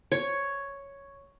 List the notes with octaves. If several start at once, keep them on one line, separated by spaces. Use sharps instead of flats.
C#5